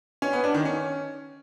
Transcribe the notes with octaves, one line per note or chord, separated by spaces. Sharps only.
C#4
B3
D4
D#3
C#4